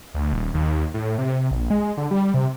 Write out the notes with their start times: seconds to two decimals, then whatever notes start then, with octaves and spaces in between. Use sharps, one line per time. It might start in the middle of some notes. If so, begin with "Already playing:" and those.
0.15 D2
0.33 D#1
0.54 D#2
0.94 A2
1.18 C3
1.32 C3
1.51 A#1
1.70 G#3
1.97 D3
2.11 G3
2.34 C3